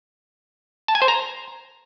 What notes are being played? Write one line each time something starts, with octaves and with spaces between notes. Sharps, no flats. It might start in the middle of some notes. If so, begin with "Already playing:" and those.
A5
G#5
C5
A#5